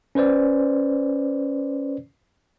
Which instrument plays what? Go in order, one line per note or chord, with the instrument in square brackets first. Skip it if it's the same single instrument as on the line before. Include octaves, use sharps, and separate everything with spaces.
[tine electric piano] C#4 B4 C5 D5